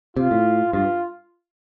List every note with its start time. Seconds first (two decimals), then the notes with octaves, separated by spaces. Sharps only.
0.17 C3 F4
0.31 A2
0.73 G2 F4